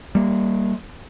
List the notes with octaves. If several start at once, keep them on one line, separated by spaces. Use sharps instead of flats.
G3 A#3